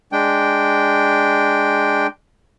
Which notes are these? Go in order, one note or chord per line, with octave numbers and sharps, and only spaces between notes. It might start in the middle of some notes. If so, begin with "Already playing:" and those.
G#3 D4 G5